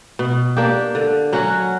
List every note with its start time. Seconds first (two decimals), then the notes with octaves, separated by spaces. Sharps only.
0.19 B2
0.57 A#3 D4 G4
0.95 D3
1.33 F#3 C#4 F#4